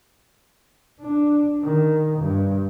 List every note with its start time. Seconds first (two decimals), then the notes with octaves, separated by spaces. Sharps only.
1.00 D4
1.63 D#3
2.19 G2